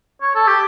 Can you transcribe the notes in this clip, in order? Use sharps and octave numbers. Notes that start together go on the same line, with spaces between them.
C#5
A4
G4